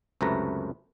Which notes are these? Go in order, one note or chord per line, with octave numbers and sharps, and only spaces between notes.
C#2 F#2 C3 A3 B4 A#5